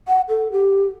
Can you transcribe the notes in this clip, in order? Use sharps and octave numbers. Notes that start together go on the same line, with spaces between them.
F#5
A4
G4